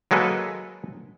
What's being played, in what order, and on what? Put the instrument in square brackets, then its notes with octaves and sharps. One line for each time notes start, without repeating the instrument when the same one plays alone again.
[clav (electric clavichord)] F#3 G#3 A#3 A4 B4